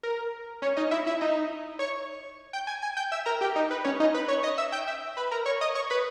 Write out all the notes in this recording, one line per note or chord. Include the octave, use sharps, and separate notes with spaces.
A#4
C#4 C#5
D#4 D#5
E4 E5
E4 E5
D#4 D#5
C#5 C#6
G5 G6
G#5 G#6
G#5 G#6
G5 G6
E5 E6
A#4 A#5
G4 G5
D#4 D#5
B4
C#4 C#5
D#4 D#5
B4 B5
C#5 C#6
D#5 D#6
E5 E6
G5 G6
E5 E6
B4 B5
A#4 A#5
C#5 C#6
D#5 D#6
C#5 C#6
B4 B5